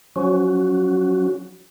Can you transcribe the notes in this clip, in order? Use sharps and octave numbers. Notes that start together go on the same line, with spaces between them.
F3 F#3 C#4 F#4